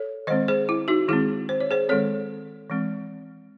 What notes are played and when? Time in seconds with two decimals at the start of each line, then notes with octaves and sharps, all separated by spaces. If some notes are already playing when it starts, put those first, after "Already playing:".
Already playing: A4 C#5
0.27 D#3 G#3 C4 C5 D#5
0.48 G#4 C5
0.69 E4
0.88 D#4 F#4
1.08 D#3 G#3 C4 E4 G#4
1.49 C5
1.60 C#5
1.71 G#4 C5
1.89 D#3 G#3 C4 A4 C#5
2.70 E3 G#3 C4